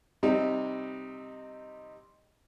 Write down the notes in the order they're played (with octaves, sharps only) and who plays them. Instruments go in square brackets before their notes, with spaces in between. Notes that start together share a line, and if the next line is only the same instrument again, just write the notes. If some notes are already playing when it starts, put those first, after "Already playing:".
[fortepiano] C3 G3 C4 D#4